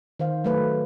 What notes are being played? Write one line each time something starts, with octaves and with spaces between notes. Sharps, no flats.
D#3 C5 F5
F#3 A3 B4